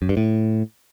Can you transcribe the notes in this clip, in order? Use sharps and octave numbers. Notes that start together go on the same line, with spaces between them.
F#2
G2
A2